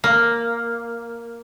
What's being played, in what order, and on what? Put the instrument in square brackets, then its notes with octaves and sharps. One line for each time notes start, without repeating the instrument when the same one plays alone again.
[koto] A#3